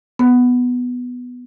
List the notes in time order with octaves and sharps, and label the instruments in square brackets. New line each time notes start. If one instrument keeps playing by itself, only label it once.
[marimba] B3